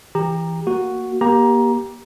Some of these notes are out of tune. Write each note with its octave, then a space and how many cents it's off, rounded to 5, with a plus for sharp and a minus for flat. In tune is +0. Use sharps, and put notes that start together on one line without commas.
E3 +5 G4 +25 A#5 +0
A#3 +0 F#4 +0
A#3 +30 G4 +0 A#5 +15